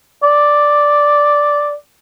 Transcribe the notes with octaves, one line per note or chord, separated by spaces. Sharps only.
D5